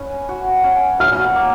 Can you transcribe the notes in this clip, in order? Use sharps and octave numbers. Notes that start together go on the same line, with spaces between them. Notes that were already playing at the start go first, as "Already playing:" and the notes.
Already playing: C#4 B4
F#4
C#4
F#4 F6
A#3